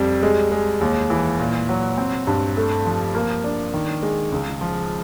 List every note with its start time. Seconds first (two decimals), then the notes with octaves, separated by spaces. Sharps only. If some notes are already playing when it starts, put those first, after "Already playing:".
Already playing: F2 G3
0.23 G#3
0.52 G#3
0.81 D#2
1.10 E3
1.39 A#2
1.69 F#3
1.98 C4
2.27 G2
2.57 A3
2.85 F3
3.15 A#3
3.44 D4
3.74 D#3
4.03 G#3
4.32 C#2
4.61 F3